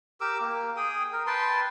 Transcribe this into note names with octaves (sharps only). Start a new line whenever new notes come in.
G4 A#4 D6 E6
A#3
G#4 G5 D#6
A#4
B4 G5 A5 C6